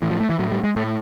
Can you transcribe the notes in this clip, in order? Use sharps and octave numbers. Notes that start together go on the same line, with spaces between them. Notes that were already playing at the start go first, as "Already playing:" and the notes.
A2 E3
F3
A3
E3
A2 F#3
G3
G#3
A2 A3